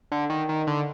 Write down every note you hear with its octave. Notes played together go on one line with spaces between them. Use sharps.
D3
D#3
D#3
D3